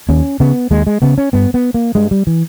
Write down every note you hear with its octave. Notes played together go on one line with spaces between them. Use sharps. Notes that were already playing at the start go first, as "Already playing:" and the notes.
D#2 C#4
C#3 B3
D#2 G#3
G#3
C#3 B3
C#4
G2 B3
B3
A#3
G2 G#3
G3
E3